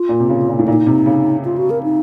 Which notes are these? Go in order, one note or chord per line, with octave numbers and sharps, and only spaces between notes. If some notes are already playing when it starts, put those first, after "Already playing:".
Already playing: F4
A#2
C3
C#3
A#2
A2
A#2 D#4
C3
C#3
F4
F#4
A#4
D#4